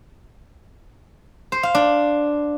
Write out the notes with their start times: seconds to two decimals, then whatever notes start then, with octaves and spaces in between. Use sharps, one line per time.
1.52 C5
1.63 F5
1.75 D4